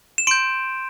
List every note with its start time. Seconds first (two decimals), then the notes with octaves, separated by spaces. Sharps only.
0.18 E7
0.27 C6 G6 D7